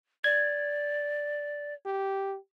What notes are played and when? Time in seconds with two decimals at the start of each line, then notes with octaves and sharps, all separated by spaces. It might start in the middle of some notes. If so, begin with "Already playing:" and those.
0.24 D5 G#6
1.86 G4